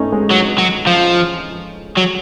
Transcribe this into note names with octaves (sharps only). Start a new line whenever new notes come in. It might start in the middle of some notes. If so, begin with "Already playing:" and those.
Already playing: A3 C#4 D#4
G#3
F#3
F#3
F3
F#3